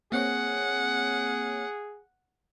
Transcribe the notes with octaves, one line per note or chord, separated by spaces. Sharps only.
A#3 C4 G#4 C#5 F#5